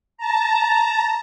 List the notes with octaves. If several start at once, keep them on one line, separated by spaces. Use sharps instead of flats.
A5 A#5